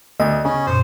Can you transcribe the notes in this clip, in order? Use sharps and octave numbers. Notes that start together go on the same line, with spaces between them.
D2 D#5
C#3 C#4
F#2 A#2 C5